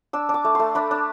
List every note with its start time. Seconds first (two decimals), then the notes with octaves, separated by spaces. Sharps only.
0.13 D4 E6
0.29 D4
0.34 D6
0.45 A3
0.55 A3 C6
0.75 D4 B5
0.91 D4